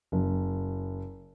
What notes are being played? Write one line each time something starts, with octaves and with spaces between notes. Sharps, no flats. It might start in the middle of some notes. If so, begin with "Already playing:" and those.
F#1